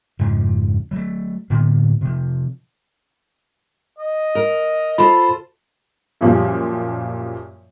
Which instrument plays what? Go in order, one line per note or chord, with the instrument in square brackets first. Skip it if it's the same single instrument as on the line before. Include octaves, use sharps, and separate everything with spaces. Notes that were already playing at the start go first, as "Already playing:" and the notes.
[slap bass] F2 G#2 C#3 F3
F#3 A3
A2 D3 A#3 B3
C3 F3
[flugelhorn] D#5
[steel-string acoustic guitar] A#4
[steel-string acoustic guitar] F4 A4 C5 [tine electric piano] B5
[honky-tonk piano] F#2 A#2 F3 G3